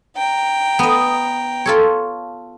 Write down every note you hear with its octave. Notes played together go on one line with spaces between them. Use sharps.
G5 A#5
B3 D#5
F4 A4 C#5